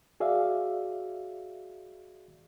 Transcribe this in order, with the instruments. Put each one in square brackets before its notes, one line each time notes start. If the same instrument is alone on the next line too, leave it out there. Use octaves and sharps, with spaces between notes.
[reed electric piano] F#4 G#4 D5 E5 F5